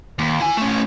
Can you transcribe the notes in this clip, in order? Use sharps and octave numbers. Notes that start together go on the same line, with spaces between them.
D#2
E4 G#5
A3 C#4